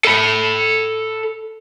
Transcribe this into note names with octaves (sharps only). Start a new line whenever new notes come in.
A4 B5